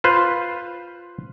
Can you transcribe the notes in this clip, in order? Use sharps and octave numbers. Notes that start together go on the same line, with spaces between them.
F4 B4 C5